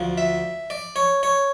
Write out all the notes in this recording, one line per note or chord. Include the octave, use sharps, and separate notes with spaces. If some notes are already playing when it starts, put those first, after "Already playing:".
Already playing: D2 D3 F3
E5
D5
C#5
C#5